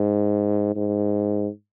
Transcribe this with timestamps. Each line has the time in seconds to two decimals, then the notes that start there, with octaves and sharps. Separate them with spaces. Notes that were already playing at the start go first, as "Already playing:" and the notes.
Already playing: G#2
0.76 G#2